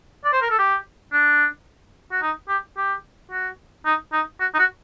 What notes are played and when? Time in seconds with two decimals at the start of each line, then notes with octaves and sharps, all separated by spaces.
0.25 D5
0.33 C5
0.42 A#4
0.50 A4
0.59 G4
1.13 D4
2.12 F#4
2.22 D#4
2.49 G4
2.77 G4
3.32 F#4
3.86 D#4
4.13 D#4
4.40 F#4
4.54 D#4
4.59 F#4